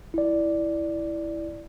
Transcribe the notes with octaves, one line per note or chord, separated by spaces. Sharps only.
E4 D5